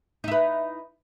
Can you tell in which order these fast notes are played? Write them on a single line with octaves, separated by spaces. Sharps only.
D#4 E4 B4